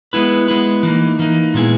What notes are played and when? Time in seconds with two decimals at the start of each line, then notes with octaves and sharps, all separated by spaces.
0.13 G#3 B3 E4 B4
0.48 G#3 B3 E4 B4
0.83 E3 A#3 D#4
1.19 E3 A#3 D#4
1.54 A#2 G#3 B3 E4 G#4